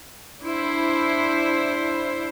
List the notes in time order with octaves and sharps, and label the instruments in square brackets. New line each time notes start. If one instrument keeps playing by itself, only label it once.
[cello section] D4 E4 C5